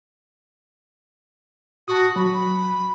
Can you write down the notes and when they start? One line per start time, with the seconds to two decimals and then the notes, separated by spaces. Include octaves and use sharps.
1.88 F#4 A5 C#6 D#6
2.16 F#3 B5